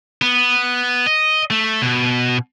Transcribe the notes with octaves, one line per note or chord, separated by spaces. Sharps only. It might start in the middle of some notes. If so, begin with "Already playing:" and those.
B3
D#5
A3
B2